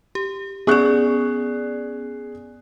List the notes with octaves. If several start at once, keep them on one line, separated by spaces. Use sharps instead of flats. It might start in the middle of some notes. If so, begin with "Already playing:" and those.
G4
B3 C#4 G#4 D5 C#6 F#6